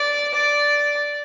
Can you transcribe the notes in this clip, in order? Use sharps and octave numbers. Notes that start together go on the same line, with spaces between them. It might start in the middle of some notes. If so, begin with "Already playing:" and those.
Already playing: D5
D5